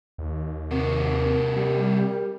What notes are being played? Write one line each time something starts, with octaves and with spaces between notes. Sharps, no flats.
D#2
C3 C4 F#4 A#4
G3 G4